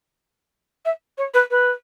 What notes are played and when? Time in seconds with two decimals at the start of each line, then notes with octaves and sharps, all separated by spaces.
0.85 E5
1.18 C#5
1.34 B4
1.51 B4